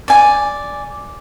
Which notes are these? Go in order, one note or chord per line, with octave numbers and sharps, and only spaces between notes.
D5 G#5